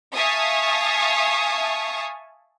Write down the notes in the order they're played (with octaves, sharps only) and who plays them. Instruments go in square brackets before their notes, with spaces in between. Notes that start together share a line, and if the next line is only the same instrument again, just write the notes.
[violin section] E5 F5 G#5 A5 C#6 D#6